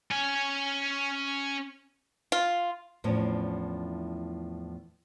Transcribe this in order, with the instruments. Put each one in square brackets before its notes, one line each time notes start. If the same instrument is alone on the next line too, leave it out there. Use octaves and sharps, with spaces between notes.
[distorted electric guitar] C#4 G#5
[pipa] F4
[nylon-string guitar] E2 A2 F3 C#4 D4